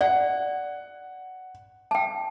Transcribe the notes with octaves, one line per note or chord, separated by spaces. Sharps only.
D5 F#5
G5 A5